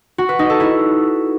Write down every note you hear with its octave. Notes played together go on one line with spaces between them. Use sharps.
F#4
B4
D#4
A4
E4